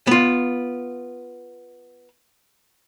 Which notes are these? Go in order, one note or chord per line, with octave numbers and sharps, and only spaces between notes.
B3 F4